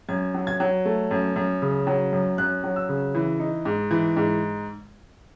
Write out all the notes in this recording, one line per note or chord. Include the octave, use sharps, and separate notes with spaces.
F#2 G#6
F#3
G#6
F#3
A3
F#2
F#2
C#3
F#3
F#2
F#2 F#6
F#3
E6
C#3
E3
D#4
G#2
E3
G#2